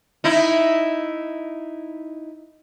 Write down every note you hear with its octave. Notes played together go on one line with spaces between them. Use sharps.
D#4 E4